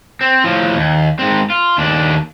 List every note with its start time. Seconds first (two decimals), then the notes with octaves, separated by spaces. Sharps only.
0.21 C4
0.44 A2 F3
0.76 D#2
1.19 G#2 C4
1.50 F4
1.78 D#2 D4